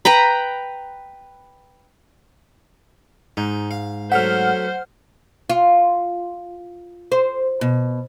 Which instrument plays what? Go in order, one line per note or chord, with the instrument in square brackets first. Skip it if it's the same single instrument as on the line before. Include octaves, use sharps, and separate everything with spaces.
[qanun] B4 G5 A#5 B5
[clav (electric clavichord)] G#2 [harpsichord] D#4
[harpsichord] F5
[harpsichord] F#3 A3 E5 [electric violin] C5 [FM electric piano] F#5 F6
[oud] F4
C5
B2